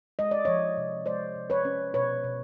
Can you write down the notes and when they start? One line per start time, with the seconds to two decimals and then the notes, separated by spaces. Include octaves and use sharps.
0.19 G#3 D#5
0.31 D5
0.45 F3 C#5 D#5
0.77 C3
1.06 G#3 C5 D5
1.36 C3
1.50 B4 C#5
1.65 C#4
1.94 B2 B4 C#5
2.24 B2